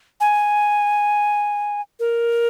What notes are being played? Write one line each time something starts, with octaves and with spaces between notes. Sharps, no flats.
G#5
A#4